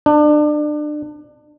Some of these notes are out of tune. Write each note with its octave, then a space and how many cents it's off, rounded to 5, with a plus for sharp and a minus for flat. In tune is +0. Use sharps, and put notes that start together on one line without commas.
D4 +30